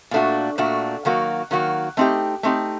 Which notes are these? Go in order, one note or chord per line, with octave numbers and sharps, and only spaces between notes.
A#2 A3 D4 F#4
A#2 A3 D4 F#4
D#3 F#3 A#3 F#4
D#3 F#3 A#3 F#4
A3 C4 D#4 G4
A3 C4 D#4 G4